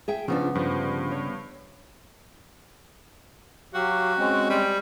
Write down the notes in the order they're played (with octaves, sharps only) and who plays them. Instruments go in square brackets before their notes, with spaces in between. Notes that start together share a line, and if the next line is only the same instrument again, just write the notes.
[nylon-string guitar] G#4 E5 G5
[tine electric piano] C#3 B3 [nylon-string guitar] F3 C#4 D4
[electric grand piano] G2 [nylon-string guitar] F3 G3
[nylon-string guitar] C#5
[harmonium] F#3 G4 F5 [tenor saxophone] F#4
[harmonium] G#3 C4 C#4
[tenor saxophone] G3